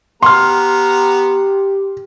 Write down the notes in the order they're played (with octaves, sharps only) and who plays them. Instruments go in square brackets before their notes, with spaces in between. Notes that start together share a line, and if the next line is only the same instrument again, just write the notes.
[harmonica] B3 A#5 [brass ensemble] G4 [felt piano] C6 F6